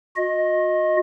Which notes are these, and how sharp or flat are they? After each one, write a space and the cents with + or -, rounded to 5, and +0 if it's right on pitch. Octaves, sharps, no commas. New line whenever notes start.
F#4 -45 D#5 +0